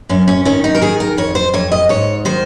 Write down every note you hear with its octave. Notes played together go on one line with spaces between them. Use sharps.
F#2 C#4
C#4
D#3 C#4
D#4
A#4
D#3 G#4
A#4
F2 C#5
C5
F2 C#5
D#5
G#2 C#5
D#3 C5